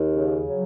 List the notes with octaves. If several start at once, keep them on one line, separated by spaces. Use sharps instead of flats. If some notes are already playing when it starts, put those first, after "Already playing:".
Already playing: D#2
C#3
F#3